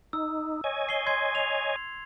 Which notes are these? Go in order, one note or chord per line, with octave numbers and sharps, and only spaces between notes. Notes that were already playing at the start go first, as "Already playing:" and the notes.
D#4 E6
C#5 D#5 G#5
C7 G7
C6 G#6 C7
C7 F7